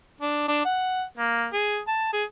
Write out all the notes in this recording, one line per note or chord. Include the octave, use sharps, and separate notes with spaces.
D4
D4
F#5
A#3
G#4
A5
G#4